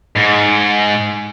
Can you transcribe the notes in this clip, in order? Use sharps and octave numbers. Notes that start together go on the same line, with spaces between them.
G#2